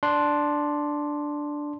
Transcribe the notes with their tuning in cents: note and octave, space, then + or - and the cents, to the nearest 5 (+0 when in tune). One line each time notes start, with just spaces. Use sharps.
D4 +0 C6 +0